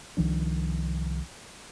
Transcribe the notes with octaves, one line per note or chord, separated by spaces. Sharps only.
C2 D#3 F3 D4